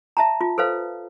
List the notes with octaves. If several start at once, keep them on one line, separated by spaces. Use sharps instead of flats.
E5 A5 A#5
F4
A4 B4 C5 F5